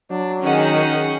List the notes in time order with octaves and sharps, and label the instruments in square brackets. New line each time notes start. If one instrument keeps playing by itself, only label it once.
[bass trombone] F#3 [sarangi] D4
[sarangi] D#3 [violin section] C#4 G#4 F#5